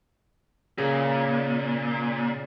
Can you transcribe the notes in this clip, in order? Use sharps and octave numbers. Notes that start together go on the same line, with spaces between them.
A#2 C#3